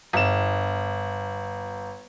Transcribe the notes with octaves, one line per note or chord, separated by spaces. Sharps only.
G1 E7